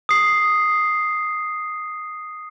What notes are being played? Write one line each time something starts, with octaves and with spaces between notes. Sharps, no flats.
D#6 C7